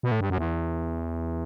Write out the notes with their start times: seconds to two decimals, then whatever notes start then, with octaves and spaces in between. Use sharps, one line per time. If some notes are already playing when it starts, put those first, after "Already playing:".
0.03 B2
0.12 A2
0.21 G2
0.30 F#2
0.38 E2